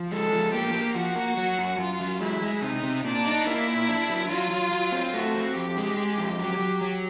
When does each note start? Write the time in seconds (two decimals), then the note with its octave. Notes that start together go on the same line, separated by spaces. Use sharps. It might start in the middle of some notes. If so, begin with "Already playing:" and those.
Already playing: F3
0.11 G#3 A4
0.33 F3
0.53 A#3 G4
0.74 A#3
0.95 F3 F#4
1.16 A#3
1.37 F#3
1.59 F#2
1.79 F#2 F4
2.00 F#3
2.20 G#3 E4
2.42 G#3
2.62 C3 D#4
2.83 C3
3.04 A#2 D4
3.26 D#4
3.46 A#3 E4
3.68 A#2
3.89 D4
4.10 F#3
4.30 F#3 F4
4.50 F#3
4.72 F#3
4.92 C4
5.13 A3 F#4
5.34 C4
5.55 F2 G4
5.77 G#3
5.97 G#3
6.18 F2
6.39 F#3 G4
6.59 F#3
6.81 F#3